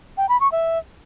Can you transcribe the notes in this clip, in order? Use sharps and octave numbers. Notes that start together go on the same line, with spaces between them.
G5
B5
C#6
E5